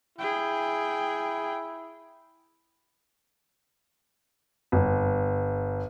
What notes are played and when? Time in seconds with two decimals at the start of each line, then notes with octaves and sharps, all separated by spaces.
0.18 E4 G#4 G5
4.72 G1